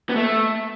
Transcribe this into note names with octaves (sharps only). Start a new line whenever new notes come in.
B3
A3